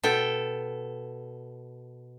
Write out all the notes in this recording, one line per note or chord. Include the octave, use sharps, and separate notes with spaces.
B2 A4 G5